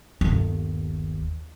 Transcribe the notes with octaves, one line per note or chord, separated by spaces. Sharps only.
G1 D#2